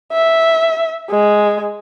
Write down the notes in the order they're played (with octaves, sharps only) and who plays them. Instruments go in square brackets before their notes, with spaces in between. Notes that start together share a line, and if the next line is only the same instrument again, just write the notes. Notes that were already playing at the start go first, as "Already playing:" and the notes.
[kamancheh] E5
G#3